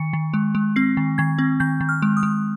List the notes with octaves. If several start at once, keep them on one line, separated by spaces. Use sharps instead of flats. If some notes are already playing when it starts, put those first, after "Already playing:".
Already playing: D#3 C#7
D#3
G#3
G#3
C4 C7
D#3
D#3 G#6
C4
D#3 G6
D#3
F6
G#3
D#6
G#3